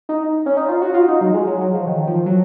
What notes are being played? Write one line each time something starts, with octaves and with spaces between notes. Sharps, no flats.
D#4
C#4
D#4
F4
F#4
F4
D#4
F#3
G#3
F#3
F#3
F3
D#3
F3
F#3